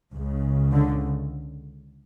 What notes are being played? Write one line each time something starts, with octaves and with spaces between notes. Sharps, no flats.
C#2 C#3
D3